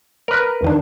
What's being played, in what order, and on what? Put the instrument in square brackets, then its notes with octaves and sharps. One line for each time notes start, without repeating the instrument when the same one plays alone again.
[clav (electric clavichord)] A#4 B4
[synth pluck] E2 D#3 D4